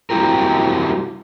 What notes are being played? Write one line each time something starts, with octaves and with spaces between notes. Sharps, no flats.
G3 C4 E4 F#4 G4 A#4